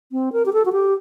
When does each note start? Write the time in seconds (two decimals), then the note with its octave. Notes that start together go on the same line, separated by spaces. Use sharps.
0.12 C4
0.33 A#4
0.46 G4
0.53 A4
0.65 F#4
0.72 G4